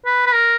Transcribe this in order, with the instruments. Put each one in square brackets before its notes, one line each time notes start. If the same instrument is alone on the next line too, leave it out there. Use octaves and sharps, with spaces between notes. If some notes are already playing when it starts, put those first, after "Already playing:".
[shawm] B4
B4
A#4